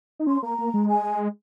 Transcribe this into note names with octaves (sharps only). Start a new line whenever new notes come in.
D#4
C#4 C6
A#3 A#5
A#3
G#3
G#5